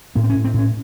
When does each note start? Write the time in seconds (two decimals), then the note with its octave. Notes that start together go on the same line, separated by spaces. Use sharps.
0.15 A2 B3
0.24 C4
0.30 C#4
0.34 A2
0.44 C4
0.54 A2 C#4